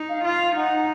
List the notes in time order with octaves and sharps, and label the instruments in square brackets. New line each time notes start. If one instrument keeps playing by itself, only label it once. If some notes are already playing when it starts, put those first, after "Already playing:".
Already playing: [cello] D#4
[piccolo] F5
[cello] F4 [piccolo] F5
[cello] D#4 [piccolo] F#5